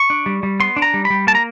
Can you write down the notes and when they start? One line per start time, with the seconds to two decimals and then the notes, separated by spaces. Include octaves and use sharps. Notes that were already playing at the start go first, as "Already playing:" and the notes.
Already playing: C#6
0.10 D4
0.26 G3
0.43 G3
0.60 B3 C6
0.76 D4
0.82 A#5
0.94 G3
1.05 B5
1.10 G3
1.27 A#3 A5
1.35 A#5